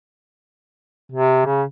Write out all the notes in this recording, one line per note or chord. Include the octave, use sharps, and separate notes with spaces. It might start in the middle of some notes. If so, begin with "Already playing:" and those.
C3
C#3